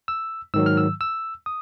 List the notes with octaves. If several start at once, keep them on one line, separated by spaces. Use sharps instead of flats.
E6
G#2 D#3 F#3 E6
F6
E6
E6
D#6